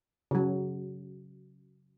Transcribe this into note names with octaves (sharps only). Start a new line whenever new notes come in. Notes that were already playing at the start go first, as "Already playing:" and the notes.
C#3 F#3